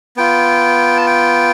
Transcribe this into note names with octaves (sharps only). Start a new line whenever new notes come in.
B3 F4 G5
A5
G5